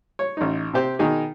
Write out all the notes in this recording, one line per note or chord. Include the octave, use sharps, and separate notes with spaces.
C#5
A1 D#4
C3 C4 G4 C5
B2 D#3 D#4 G#4